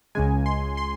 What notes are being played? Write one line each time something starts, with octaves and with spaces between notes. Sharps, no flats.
C#2 C#3 G#3 G#5
C6
C6